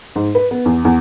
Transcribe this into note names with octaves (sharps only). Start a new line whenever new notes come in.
G#2
B4
B3
E2
E2